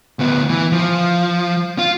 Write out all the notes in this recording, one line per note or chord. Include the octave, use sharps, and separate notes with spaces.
D2 B3
E3
F3
F4